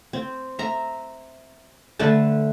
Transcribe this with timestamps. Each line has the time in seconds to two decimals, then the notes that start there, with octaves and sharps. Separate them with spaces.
0.13 C4
0.59 E5 A#5
1.99 D3 A3 B4 A5